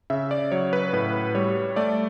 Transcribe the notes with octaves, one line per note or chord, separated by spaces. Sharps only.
C#3 E5
D5
F#3 C#5
B4
A2 B4
G3 C#5
A3 D5